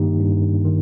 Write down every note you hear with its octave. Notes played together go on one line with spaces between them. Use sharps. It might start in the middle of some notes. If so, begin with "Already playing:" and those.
Already playing: G2 D#3 A#3 D#4 G4
G2
D#3